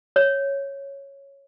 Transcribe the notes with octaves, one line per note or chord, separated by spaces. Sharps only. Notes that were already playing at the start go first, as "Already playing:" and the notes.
C#5